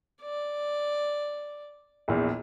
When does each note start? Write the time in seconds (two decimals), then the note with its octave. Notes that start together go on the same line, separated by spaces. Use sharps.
0.22 D5
2.08 A#1 E2